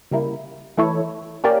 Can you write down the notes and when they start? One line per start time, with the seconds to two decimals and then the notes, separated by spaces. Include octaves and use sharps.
0.11 C#3 G3 A#3 E4
0.77 E3 A3 E4 A4 C#5
1.44 A#3 C#4 G4 A#4 D5